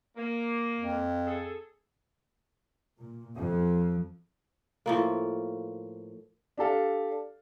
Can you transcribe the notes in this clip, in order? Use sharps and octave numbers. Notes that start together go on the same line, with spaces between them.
A#3
F2
G#4 A4
A#2
F2
A2 F3 A#3
D4 G4 A4 F5